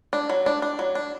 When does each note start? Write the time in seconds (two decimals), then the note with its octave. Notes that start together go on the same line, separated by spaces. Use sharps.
0.13 D4
0.30 F#3
0.46 D4
0.62 D4
0.79 F#3
0.95 D4